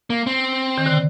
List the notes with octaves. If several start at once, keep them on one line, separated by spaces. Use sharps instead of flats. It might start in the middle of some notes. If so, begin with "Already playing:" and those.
A#3
C4
D#3
D3
C3